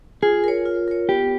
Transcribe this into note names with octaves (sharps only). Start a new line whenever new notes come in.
F4 G#4
A#4 C#5
F4
A#4 C#5
B3 G4